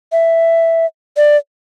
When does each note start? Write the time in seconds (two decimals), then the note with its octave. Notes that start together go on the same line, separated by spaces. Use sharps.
0.12 E5
1.17 D5